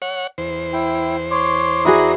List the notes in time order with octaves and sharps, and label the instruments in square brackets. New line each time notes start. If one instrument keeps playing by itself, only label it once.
[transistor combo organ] C#5 F#5
E2 C5
[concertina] E4 G5
C#5 C6 D6
[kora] E4 F#4 G#4 [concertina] D5 A#5 D#6